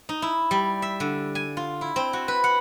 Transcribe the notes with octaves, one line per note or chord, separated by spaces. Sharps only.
D#4
E4
G3
E5
D3
G#5
F4
E4
C4
F#4
B4
F#5